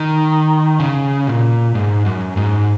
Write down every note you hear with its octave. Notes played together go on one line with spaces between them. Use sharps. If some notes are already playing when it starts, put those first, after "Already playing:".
Already playing: D#3
C#3
A#2
G#2
F#2
G#2